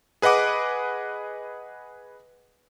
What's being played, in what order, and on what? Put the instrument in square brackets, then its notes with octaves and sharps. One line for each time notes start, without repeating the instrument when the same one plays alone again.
[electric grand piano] G#4 B4 D#5 F#5 D6